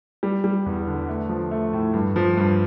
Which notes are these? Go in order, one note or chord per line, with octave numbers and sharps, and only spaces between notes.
G3
G3
E2
D3
A3
F3
A3
A2
G2
F3
G2